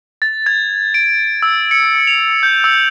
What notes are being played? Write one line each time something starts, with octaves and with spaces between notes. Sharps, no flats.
A6
G#6
D7
E6
C#7
F7
G6
E6